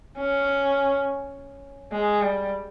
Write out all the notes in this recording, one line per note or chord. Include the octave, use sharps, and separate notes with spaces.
C#4
G#3
G3